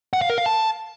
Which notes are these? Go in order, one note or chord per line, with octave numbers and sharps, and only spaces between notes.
F#5
F5
A#4
F5
A5